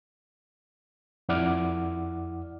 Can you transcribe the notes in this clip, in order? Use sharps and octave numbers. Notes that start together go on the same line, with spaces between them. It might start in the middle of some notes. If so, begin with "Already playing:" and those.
F2 E4 D5 F#5 D6 F6